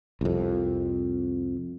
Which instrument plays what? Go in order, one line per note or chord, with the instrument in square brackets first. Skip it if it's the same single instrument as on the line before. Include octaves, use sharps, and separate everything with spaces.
[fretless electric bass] C2 F2